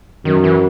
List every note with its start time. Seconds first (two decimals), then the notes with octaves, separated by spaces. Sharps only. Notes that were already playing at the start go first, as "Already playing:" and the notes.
0.25 F#2 D#3
0.44 E3